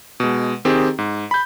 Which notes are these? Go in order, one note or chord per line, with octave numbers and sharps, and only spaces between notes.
B2 G#3
D#3 C4 G4 G#4
G#2
B5 G6